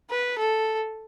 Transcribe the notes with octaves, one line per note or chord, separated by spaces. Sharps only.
B4
A4